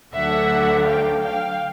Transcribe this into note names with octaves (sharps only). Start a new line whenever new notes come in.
D2 D3 F#3 A3 D4 E5 F#5
F5 G5
F5 G5